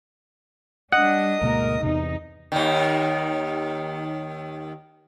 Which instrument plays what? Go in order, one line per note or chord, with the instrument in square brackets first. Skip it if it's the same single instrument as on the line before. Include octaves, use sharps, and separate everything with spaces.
[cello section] G3 D4 [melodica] D#5 D#6 [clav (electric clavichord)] F#5
[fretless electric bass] D2 B2 A#3 [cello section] G#2 A#4
[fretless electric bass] E2 C3 [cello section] D#4
[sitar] D#2 D#3